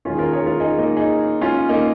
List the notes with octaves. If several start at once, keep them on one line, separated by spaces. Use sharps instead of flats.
D#2 D#3 C#4 F4
G#4
F4 A#4
G#4 C#5
F4 A#4
D#4 G#4
A#3 D#4
D#4 G#4
C#4 F4
A#3 D#4